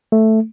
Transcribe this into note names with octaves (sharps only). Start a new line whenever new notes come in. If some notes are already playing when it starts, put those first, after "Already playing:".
A3